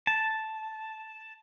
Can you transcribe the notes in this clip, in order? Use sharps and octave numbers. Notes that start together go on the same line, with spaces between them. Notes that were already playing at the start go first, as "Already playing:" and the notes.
A5